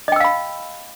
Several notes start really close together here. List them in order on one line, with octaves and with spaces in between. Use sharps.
D#5 G5 E6 F5 B5